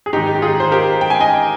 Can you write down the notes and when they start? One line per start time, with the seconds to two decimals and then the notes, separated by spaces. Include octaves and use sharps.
0.06 G#4
0.13 G#2 D#3 D#4 G4
0.35 G4
0.42 F4 G#4
0.60 C5
0.72 G4 A#4
1.01 G5
1.10 G#5
1.20 D#5 G5